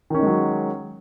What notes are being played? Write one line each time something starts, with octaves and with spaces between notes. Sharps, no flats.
D#3 F#3 G#3 C#4 D#4